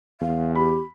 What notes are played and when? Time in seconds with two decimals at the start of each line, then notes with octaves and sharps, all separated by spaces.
0.21 E2 F5
0.55 G4 B5